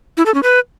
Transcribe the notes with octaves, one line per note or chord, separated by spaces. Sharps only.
E4
A4
C#4
B4